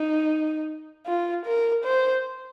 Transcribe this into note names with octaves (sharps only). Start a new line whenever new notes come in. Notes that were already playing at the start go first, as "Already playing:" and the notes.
Already playing: D#4
F4
A#4
C5